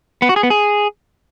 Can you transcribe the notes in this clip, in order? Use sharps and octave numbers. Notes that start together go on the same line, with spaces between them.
B3
F#4
G#4
B3
G#4